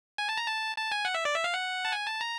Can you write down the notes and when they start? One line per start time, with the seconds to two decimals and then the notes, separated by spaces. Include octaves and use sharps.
0.18 G#5
0.29 A5
0.38 A#5
0.47 A5
0.77 A5
0.92 G#5
1.05 F#5
1.15 E5
1.25 D5
1.35 E5
1.44 F5
1.54 F#5
1.85 A5
1.92 G#5
2.07 A5
2.21 A#5